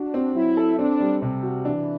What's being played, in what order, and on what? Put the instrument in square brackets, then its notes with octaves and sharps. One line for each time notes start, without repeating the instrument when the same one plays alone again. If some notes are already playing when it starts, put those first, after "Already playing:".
Already playing: [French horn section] D4 [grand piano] F#4
[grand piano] C4
[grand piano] F#3 [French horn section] E4
[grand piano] A4
[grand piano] C4 [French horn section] D4
[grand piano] G3
C3
F#4
[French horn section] E3 [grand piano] D4